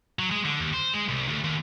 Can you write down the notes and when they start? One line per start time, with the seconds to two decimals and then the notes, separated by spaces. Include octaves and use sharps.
0.19 F#3
0.31 G#3
0.45 D3
0.60 D#2
0.73 C5
0.93 G#3
1.09 C2
1.29 D2
1.44 D#2